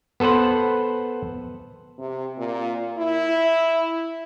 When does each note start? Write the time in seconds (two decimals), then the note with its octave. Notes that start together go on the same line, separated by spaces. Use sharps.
0.20 B3 A4 B4 C5 F#5
1.99 C3
2.38 A#2
2.98 E4